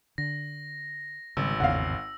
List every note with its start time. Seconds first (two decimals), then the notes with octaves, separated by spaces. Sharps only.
0.18 D3 A#6
1.37 G#1 C#3 G3 E6
1.60 A1 E2 C#3 F5 F#5